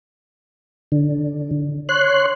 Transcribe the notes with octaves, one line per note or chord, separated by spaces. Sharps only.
D3
C#5 C6 F#6